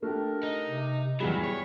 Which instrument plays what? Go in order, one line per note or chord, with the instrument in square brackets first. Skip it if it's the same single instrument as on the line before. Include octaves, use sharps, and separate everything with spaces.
[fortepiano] A3 G4 [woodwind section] D4 A#4
[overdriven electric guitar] D#4
[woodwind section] C3
[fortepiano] E2 G3 G#4 [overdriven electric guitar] F#3 [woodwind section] B5
[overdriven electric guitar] C#5